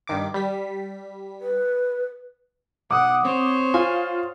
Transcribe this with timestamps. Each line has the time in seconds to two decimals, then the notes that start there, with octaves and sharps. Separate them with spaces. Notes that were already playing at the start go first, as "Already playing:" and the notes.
0.07 G2 D#3 D6
0.34 G3 B6
1.41 B4
2.91 B1 F#5 D6 D#6
3.25 C4 C5 C#5
3.74 F4 G#5